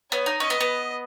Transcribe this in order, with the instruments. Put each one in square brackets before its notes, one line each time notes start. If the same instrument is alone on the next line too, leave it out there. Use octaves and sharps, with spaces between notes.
[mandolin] B3 [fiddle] C#5
[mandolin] D#4
[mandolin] C#4 [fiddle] D#5
[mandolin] B3
B3